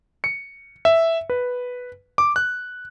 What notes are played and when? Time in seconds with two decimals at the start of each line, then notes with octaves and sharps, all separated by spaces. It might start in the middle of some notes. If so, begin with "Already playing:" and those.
0.24 C#7
0.85 E5
1.30 B4
2.18 D6
2.36 F#6